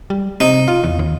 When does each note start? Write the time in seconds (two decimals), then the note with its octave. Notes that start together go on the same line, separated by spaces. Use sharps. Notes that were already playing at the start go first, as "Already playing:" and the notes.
0.10 G3
0.40 C3 D#4
0.68 F4
0.84 E2
0.99 D#2